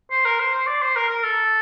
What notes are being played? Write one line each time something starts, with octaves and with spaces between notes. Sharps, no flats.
C5
A#4
C5
C5
D5
C5
A#4
A#4
A4